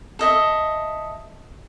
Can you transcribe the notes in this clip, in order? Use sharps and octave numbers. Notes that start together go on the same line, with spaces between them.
A4 D#5 E5